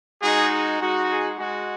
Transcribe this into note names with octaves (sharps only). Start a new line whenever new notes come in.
G#3 D#4 F#4 G#4
G#3 D#4 F#4
G#4
G#3 F#4